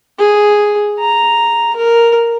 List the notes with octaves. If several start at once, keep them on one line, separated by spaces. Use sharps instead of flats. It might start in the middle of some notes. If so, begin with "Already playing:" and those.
G#4
A#5
A#4